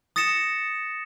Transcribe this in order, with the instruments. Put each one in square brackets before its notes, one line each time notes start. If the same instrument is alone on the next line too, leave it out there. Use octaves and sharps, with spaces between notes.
[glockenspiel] D#6 A6 A#6 C#7 E7